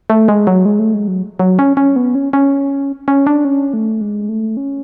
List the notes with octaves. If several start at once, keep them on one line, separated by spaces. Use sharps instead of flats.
A3
G#3
F#3
G#3
A3
G#3
F#3
F#3
C#4
C#4
B3
C#4
C#4
C#4
D4
C#4
A3
G#3
A3
C#4